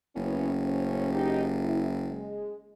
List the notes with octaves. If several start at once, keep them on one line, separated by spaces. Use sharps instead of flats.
F#1 B3 C#4 E4
A2 C#4 C5
D#4 G4
E4
G#3